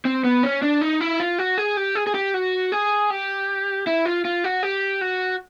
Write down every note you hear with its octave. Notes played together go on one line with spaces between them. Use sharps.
C4
B3
C#4
D4
D#4
E4
F4
F#4
G#4
G4
G#4
G#4
G4
F#4
G#4
G4
E4
F4
F4
F#4
G4
F#4